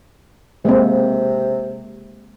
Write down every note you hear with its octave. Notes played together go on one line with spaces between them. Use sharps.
C3 G#3 A#3 C4